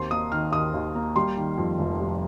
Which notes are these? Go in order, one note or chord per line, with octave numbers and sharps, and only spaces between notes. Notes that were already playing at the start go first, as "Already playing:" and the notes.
Already playing: D#2 C4 C6
A#3 D#6
D#3 F6
D#2 D#6
D#2
A#3
G3 C6
D#3
F2
F1
G3